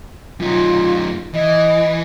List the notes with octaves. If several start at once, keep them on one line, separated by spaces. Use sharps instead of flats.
F#2 D#4 F4
E3 D#5